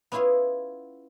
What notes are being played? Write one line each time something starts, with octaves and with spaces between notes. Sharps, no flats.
B3 C#4 E4 F4 G#4 C#5